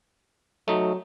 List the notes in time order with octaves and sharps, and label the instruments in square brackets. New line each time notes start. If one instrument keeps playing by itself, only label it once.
[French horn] F#3 [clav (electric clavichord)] A3 D#4